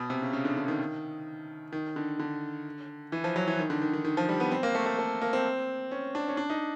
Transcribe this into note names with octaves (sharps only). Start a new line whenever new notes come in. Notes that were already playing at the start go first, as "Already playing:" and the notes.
Already playing: B2
C3
C#3
C#3
D3
D3
D#3
D#3
D3
D3
E3
F3
F#3
E3
D#3
D3
D#3
D#3
D#3
F3
G3
B3
C4
A#3
A3
A3
A3
A#3
C4
C#4
D4
C#4
D4
D#4